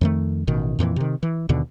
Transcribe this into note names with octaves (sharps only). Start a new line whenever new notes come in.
F2 D#3 A3
A1 B2 D#3
F2 A#2 D3 E3
C3 D#3
E3
D#2 B2 D3